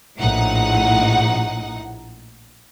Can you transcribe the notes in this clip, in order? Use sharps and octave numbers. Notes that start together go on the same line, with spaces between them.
A#1 A2 D#4 F#5